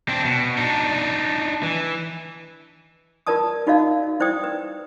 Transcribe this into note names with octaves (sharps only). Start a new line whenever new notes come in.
C4 D4
B2
D4 D#4
E3
F4 A#4 B4 D5 A5 D#6
D#4 F4 F#4 D5 D#5 F5
E4 C5 D5 G5 D#6
B4